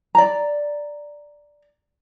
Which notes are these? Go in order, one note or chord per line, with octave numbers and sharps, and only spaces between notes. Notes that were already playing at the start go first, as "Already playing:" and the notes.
D5 A#5